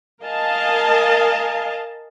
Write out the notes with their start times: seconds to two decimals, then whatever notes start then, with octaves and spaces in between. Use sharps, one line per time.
0.24 A#4 D#5 F5 G#5 A5